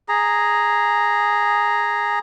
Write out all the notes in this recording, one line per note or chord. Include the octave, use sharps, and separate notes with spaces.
G#4 A#5